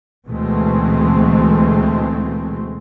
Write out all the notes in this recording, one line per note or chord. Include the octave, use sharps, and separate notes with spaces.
D2 B2 E3 G#3 A3 C4